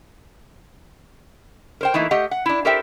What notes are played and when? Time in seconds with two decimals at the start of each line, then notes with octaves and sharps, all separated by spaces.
1.81 A#4 C5 G5
1.94 E3 A3 A#3 D#4 E4
2.11 A3 G4 D#5 F#5
2.31 F#5
2.46 D4 E4
2.65 G4 A4 A#4 C5 E5 G5